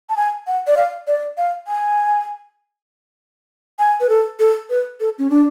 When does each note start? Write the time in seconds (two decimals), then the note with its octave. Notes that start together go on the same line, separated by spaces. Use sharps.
0.09 A5
0.17 G#5
0.47 F#5
0.67 D5
0.77 F5
1.07 D5
1.38 F5
1.67 G#5
3.79 G#5
4.00 B4
4.09 A4
4.39 A4
4.70 B4
5.00 A4
5.18 C#4
5.30 D4